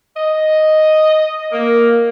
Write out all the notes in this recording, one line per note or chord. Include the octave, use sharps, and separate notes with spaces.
D#5
A#3